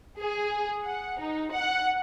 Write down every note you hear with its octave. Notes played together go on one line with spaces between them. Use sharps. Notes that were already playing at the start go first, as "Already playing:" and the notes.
G#4
F#5
D#4
F#5